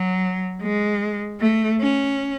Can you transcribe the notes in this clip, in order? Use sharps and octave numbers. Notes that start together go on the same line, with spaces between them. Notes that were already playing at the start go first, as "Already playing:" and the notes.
Already playing: F#3
G#3
A3
C#4